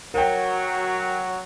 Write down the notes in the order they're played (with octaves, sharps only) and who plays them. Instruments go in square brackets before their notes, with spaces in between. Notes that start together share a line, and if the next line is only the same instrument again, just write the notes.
[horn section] F#3 [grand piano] A#4 G5